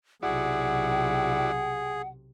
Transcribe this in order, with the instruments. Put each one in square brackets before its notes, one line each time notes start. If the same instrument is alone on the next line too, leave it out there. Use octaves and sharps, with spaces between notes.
[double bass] B1 C3 [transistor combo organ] E4 F#4 D5 [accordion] G#4 [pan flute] F#5